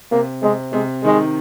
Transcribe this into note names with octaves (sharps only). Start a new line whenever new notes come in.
C3 A#3
C3 G#3
C3 G#3
D#3 G#3